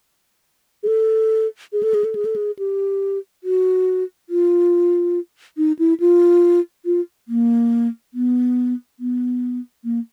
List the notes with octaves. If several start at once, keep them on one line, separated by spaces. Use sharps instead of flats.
G#4
A4
G#4
A4
G#4
A4
G#4
A4
G#4
G4
F#4
F4
D#4
E4
F4
F4
A#3
B3
B3
A#3